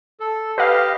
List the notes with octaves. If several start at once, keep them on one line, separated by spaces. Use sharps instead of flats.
A4
G4 B4 D#5 F5